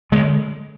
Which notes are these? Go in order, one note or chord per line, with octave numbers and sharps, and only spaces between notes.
D3 G#3